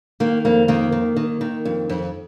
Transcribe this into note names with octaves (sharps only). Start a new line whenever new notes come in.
D#3 A#3
F2 A#3
D#3 A#3
D#3
D#3
D#3
F2
F2